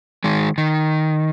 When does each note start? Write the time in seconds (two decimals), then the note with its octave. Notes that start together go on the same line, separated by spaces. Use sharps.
0.24 D#3 G#3
0.58 D#3